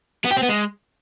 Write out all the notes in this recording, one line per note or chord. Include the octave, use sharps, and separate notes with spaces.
B3
G4
C4
B3
G#3